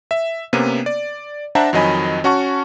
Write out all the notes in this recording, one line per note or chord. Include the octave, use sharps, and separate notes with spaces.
E5
C3 A#3 B3 C#4 D#7
D5
D4 C5 E5 F#5 A5 A#5
F2 D#3 F#3 D#5 G#5 B5
C#4 F#4 F#5 A5 C#6